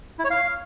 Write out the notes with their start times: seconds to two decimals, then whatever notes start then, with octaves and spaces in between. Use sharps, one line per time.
0.19 E4
0.25 C#5
0.30 F5